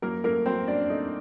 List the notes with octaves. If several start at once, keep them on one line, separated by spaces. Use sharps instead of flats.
F#2 A#3 A#4
A3 A#3 A#4
F#2 C4 C5
F#2 D4 D5
A3 D#4 D#5